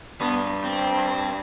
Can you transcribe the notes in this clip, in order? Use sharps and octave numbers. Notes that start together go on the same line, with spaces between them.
G2 B3
C4